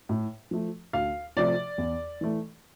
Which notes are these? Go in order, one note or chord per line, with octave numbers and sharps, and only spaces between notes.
A2
F3 A3
D2 F5
C3 F3 A3 D5
E2
E3 A3